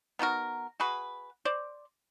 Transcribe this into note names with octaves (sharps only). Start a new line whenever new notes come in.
B3 D#4 F#4 A#4
F#4 G#4 B4
C5 D5